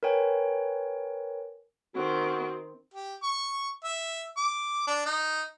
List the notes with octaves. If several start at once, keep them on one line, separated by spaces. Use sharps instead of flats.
A#4 B4 C#5 G5 G#5
D#3 C4 F#4
G4
C#6
E5
D6
D4
D#4